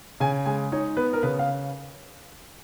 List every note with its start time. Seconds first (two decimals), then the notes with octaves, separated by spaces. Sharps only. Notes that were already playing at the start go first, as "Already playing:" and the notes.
0.20 C#3 G#5
0.46 G#3 G#5
0.72 D#4 C#5
0.97 B3 B4
1.13 A#4
1.23 C#3 B4
1.39 F5